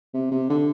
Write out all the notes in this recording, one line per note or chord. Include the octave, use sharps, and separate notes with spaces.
C3
C3
D3